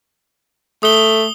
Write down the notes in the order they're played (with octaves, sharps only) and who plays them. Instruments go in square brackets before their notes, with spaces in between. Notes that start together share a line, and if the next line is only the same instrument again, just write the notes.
[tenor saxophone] A3 [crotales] D#6 G7